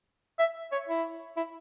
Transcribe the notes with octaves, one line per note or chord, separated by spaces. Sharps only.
E5
C#5
E4
E4